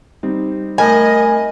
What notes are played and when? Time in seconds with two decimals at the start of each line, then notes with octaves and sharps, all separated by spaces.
0.23 G3 C4 D#4
0.78 A3 A#4 D#5 G#5 B5